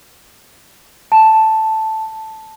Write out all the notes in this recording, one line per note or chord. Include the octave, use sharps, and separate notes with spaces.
A5